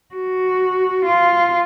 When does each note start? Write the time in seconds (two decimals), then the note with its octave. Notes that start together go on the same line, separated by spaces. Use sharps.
0.15 F#4
1.06 F4